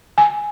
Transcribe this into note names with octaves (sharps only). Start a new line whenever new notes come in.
G#5